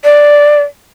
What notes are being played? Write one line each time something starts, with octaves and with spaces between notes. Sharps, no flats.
D5